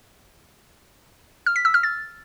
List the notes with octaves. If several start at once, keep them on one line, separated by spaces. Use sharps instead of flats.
F6
B6
E6
F6
A6